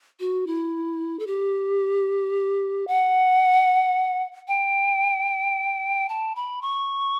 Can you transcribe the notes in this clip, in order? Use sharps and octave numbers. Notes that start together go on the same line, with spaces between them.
F#4
E4
A4
G4
F#5
G5
A5
B5
C#6